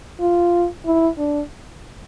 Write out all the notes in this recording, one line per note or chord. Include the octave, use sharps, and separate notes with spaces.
F4
E4
D4